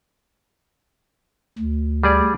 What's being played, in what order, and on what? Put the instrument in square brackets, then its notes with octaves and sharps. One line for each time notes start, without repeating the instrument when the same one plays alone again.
[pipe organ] D2
[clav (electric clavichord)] G3 G#4 D5